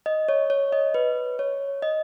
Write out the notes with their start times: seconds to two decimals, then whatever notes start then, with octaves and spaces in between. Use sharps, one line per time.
0.06 D#5
0.29 C#5
0.50 C#5
0.72 D#5
0.94 B4
1.39 C#5
1.82 D#5